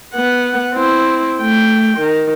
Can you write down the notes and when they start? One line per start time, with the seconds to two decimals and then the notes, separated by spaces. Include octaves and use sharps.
0.14 B3 F#5
0.74 C4 E4
1.40 A3 G5
1.98 D#3